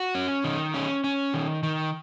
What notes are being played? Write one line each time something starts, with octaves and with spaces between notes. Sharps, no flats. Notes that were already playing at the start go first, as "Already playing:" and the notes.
Already playing: F#4
C#4
D#3
C#4
C#4
D#3
D#3